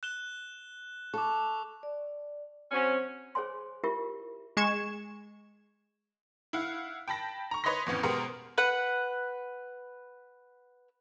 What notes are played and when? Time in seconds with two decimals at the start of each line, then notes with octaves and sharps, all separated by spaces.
0.03 F#6 E7 G7
1.14 A4 C#6 D6
1.83 D5
2.71 F#3 C4 C#4 C5 C#5
3.35 G#4 C5 C#5 G#5 C6
3.84 E4 F4 G4 A#4 E5 C#6
4.57 G#3 C#6 G#6 E7
6.53 E4 F5 F#5
7.08 G5 A5 B5 A#6
7.51 A#5 C#6
7.64 B4 C#5 D#5 B5 C6 A#6
7.86 F2 A2 E3 B3 C#4
8.03 B2 G#3 B3 G4 A#4 C5
8.58 B4 F#5